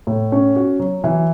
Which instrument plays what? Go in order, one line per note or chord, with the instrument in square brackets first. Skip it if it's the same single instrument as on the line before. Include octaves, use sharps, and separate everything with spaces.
[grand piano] A2
C#4
F#4
F#3
E3